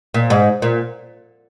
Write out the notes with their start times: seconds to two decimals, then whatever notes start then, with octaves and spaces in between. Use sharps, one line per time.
0.14 A#2
0.30 G#2
0.62 A#2